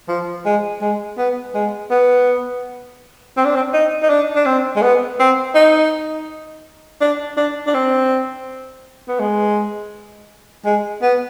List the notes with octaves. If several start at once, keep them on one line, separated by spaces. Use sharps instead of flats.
F3
G#3
G#3
B3
G#3
B3
C4
D4
C4
D#4
D#4
D4
D4
C4
G#3
B3
C4
D#4
D4
D4
D4
C4
B3
G#3
G#3
B3